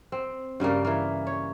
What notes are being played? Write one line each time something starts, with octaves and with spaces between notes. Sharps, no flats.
C4
G2 C#3 G3 A#3
E3 A#3
C#5